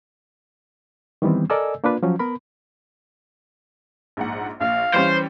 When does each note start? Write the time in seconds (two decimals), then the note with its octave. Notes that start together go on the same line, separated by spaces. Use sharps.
1.22 D#3 E3 G3 B3 C4
1.50 A4 A#4 D5 D#5 G#5 E6
1.84 A#3 D4 F4 B4
2.03 F3 F#3 C#4
2.19 B3 A#4 B5
4.17 A#1 G#2 F#5
4.61 A#1 F5
4.94 E3 G3 C#4 C5